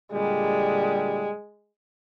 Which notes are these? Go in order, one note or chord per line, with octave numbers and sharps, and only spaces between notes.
A#2 D3 G3 G#3